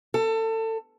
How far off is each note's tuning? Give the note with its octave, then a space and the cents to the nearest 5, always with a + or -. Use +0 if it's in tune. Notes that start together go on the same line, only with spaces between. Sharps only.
A4 +25